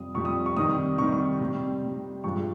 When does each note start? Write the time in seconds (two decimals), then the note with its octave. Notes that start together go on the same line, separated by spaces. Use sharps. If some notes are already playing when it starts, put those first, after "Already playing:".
Already playing: F2 C3 G3 D#6
0.14 F2 C3 G3 C#6
0.25 D#6
0.46 C#6
0.57 C3 D#3 G3 D#6
0.98 C3 D#3 G3 C#6
1.12 C#6
1.41 C3 G3
1.82 C3 G3
2.24 G2 F3 G#3 C#6